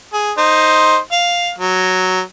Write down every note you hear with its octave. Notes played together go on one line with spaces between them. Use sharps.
G#4
D#4 C5
F5
F#3